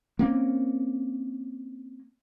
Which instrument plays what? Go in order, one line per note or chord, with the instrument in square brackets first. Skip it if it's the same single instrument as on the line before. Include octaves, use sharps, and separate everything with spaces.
[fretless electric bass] A#3 C4 C#4